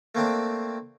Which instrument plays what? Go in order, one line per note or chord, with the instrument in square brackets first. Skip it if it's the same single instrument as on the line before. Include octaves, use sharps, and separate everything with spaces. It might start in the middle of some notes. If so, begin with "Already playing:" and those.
[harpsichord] A3 A#3 C4 D4